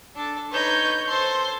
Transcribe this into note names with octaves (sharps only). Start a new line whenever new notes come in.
D4 A4
D#4 B4 C#5 G6
A4 C5 C6